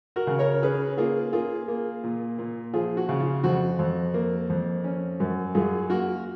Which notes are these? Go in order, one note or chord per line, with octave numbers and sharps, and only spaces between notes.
F#4 A#4
C#3
A#4 C#5
C#4 G#4 B4
A#3 F4 G#4
A#3 F4 G#4
A#3
A#2
A#2
F3 F4 G#4
F#4
C#3
F4
F2 F#4
F2
A#3
F2
C#4
F#2
F#2 F4 G#4
A#3 F#4 A#4